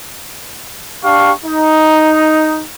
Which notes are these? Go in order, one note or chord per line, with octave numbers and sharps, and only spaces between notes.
D4 G4 F5 C#6
D#4